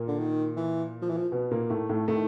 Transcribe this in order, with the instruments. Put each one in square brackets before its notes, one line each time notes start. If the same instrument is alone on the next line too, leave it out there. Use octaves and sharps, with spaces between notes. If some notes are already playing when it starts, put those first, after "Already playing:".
Already playing: [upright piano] A#2 A#3
[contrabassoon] D3
D#3
E3
F3
E3
F3
[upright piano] B2 B3
A#2 A#3
A2 A3
A2 A3
[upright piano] A2 A3 [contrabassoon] D#3